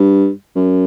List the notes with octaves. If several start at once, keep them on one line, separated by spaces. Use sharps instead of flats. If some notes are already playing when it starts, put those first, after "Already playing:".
Already playing: G2
F#2